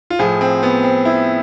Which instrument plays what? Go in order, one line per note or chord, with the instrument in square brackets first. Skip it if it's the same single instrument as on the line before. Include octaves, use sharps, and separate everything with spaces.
[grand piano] F4
A2 F3 G#4
C4
B3
C4
E4